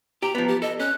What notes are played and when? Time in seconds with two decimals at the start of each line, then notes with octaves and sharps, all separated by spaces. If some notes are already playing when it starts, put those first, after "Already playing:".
0.22 G4 A#5
0.35 F3 B3
0.48 G4
0.62 A4 D#5
0.80 C#4 F#6